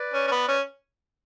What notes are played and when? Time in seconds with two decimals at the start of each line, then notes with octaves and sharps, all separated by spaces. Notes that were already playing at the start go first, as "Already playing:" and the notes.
Already playing: B4 D5
0.14 C#4
0.27 C#4
0.32 B3
0.48 C#4